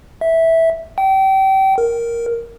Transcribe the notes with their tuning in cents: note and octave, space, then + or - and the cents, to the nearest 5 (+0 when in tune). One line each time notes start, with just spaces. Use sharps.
E5 -10
G5 -30
A#4 +0